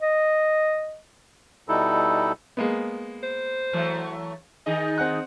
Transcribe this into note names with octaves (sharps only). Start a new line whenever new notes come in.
D#5
B2 G3 D#4 E4 A4
G#3 A#3 B3
C5
E3 F#3 A3
D#3 D#4 G#4 D#5
C4 F#5 F#6